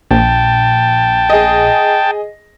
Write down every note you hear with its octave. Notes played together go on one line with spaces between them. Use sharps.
A#1 G5 A5
G#4 D#5